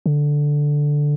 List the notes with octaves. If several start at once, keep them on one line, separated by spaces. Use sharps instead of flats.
D3